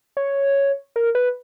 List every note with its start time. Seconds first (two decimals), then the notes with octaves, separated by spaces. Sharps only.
0.17 C#5
0.96 A#4
1.15 B4